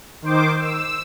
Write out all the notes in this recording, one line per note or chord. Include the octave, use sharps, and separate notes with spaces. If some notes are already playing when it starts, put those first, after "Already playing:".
D#3 C5 D6
E6